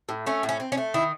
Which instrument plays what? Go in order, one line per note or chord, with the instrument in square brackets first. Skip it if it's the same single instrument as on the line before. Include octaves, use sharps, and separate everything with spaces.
[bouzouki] A2
A3 C#4
A2
C#4
C4
C#4
A3
D#3 E4